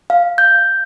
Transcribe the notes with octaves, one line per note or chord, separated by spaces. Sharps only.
F5
G6